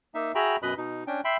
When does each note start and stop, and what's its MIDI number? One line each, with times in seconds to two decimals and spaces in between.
0.15 0.32 58
0.15 0.32 63
0.15 0.32 76
0.35 0.56 66
0.35 0.56 68
0.35 0.56 76
0.35 0.56 79
0.35 0.56 82
0.35 0.56 83
0.62 0.74 42
0.62 0.74 47
0.62 0.74 71
0.62 0.74 75
0.62 0.74 83
0.78 1.04 47
0.78 1.04 63
1.07 1.21 61
1.07 1.21 62
1.07 1.21 79
1.25 1.37 76
1.25 1.37 79
1.25 1.37 83
1.25 1.37 84